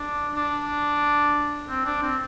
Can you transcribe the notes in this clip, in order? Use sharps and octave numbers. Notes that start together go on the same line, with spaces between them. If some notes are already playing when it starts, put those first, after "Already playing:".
Already playing: D4
D4
C4
D4
C4